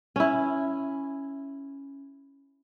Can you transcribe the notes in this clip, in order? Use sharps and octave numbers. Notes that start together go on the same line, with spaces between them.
C#4 E4